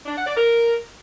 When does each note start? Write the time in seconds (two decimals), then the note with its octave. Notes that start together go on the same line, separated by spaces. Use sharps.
0.05 D4
0.16 F#5
0.26 D5
0.37 A#4